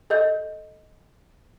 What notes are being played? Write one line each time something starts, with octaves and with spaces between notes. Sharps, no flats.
A4 D#5 G6